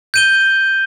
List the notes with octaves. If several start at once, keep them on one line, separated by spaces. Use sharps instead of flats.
G6 D#7 G7